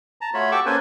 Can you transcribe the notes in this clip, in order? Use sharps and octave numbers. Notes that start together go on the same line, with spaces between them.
A5 A#5
A3 F4 F#4 C#5 B5
F#4 G4 A4 C#6 D6 E6
A#3 C#4 A4 B4 C5 G#5